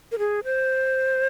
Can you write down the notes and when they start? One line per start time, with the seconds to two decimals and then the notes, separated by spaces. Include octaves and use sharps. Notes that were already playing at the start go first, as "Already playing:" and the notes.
0.12 A#4
0.19 G#4
0.44 C5